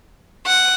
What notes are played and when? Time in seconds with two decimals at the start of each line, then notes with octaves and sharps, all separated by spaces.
0.46 F#5